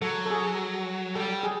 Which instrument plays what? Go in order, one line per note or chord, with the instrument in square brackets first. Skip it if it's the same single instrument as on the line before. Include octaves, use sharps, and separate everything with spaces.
[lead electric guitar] F#3 [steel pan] A4
[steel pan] A4
G#4
[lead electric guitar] G3 [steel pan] A4
[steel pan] G#4